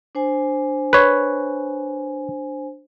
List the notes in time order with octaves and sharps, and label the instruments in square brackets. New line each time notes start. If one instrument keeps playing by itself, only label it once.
[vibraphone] D4 C5 G#5
[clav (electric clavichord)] B4 C#5